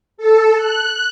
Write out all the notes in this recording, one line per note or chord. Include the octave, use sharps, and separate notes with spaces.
A4
F#6